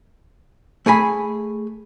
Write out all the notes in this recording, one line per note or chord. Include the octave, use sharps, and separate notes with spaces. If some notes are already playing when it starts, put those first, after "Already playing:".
A3 G#4 G#5 B5